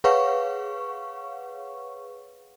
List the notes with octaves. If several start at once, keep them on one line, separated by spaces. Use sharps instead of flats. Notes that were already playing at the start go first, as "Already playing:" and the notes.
G#4 B4 C#5 F5 F#5 C#6